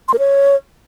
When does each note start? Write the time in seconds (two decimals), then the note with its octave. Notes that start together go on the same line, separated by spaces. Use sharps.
0.08 C6
0.14 A#4
0.19 C#5